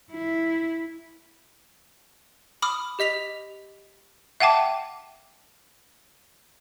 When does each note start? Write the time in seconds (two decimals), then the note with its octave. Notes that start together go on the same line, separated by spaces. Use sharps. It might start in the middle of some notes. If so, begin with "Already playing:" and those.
0.12 E4
2.62 B5 D6 D#6 F6
2.99 G4 D#5 B6 F7
4.40 E5 F#5 G5 A5 D6